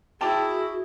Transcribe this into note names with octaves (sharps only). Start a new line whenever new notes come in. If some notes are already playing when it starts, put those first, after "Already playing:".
E4 F#4 G#4 G5 A5 D6